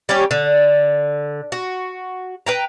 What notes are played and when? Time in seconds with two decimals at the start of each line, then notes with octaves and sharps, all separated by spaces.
0.09 G3 C#4 G4 C#5
0.31 D3
1.52 F#4
2.46 B4 G5 A#5